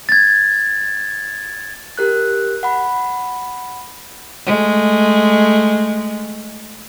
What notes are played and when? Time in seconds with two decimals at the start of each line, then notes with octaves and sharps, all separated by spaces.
0.09 G#6 A6
1.98 G4 A#4 F#6
2.63 F#5 B5
4.46 G#3 A3